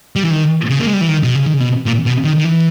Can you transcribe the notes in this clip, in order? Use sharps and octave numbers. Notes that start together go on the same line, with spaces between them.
G3
E3
D#3
C#3
A#3
G#3
G3
E3
D#3
B2
C#3
D#3
C#3
B2
A#2
B2
D#3
D#3
E3